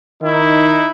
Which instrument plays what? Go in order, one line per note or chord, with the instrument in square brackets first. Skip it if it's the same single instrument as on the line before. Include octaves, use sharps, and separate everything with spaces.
[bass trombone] D#3 [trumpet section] D#4 E4